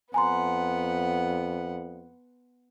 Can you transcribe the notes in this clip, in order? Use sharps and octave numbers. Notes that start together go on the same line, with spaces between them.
F2 B3 F#5 G#5 A#5 C6